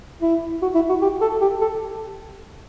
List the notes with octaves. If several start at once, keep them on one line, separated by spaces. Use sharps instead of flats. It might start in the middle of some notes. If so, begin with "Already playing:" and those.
E4
F#4
E4
F#4
G4
A4
G4
A4